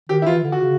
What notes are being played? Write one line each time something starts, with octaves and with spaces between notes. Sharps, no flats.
D#3 G4
E4
E3 F4
D3
F#4
C#3